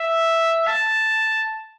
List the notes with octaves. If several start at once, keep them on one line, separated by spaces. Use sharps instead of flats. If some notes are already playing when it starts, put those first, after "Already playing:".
Already playing: E5
A5